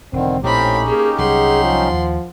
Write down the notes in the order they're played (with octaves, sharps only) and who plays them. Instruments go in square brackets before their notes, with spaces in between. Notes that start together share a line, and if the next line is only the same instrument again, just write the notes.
[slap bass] E1 [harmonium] D3 D#3 [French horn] C4
[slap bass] A#1 [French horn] A2 [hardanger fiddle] C4 B5 [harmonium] C#4 D#4 G4
[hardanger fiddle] A#3 [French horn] G#4
[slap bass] C2 F#3 G3 [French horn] G#4 [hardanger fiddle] F#5 C6
[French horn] F3
[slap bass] D#2